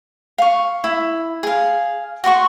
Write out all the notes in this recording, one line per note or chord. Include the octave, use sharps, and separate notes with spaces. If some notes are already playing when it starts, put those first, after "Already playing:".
F5 C#6
E4
G#4 F5
F#4 F#5 C6 C#6